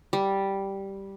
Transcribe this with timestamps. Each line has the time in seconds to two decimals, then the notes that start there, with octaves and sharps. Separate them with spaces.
0.13 G3